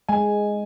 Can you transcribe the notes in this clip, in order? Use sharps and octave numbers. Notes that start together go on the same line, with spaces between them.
G#3 G#5